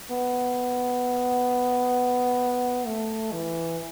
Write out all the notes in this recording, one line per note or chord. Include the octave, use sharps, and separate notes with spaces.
B3
A3
E3